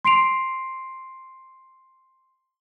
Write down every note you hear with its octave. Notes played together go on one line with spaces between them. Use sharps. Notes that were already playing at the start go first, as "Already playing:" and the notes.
C6 C7 D7 F7